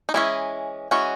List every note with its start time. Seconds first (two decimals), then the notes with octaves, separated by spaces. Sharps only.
0.09 D#4
0.14 E3 G#3 C#4 E4
0.91 E3 G#3 C#4 F#4